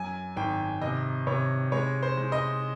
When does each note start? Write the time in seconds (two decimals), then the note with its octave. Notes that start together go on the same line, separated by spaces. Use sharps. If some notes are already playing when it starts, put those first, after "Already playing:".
Already playing: F#2 G#5
0.36 G#1 G5
0.82 C3 D#5
1.27 C3 C#5
1.72 G#3 C#5
2.03 C5
2.17 G#3
2.32 D#5